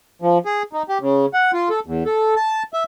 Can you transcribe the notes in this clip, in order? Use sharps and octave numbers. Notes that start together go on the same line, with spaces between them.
F3
G#4
D#4
G4
C#3
F#5
F4
A4
E2
A4
A5
E5